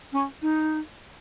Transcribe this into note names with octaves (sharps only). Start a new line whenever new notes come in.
C#4
D#4